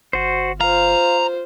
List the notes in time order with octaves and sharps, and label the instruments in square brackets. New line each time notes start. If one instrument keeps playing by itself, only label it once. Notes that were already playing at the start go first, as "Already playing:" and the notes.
[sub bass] G1 [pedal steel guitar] F#4 C5
[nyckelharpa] F4 C5 [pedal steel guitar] F5 [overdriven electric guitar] A#5